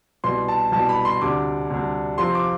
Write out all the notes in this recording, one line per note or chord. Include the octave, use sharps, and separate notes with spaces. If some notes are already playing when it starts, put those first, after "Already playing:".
C2 B2 B3 C6
A5
C2 B2 B3 A5
B5
C6
D2 C3 G3 D4 D6
D2 C3 G3 D4
F2 C3 F3 C4 C6
D6